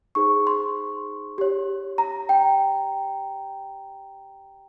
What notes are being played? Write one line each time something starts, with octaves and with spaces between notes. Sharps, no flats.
D#4 G#4 C5 C#6
C6
G4 C#5
A#5
G5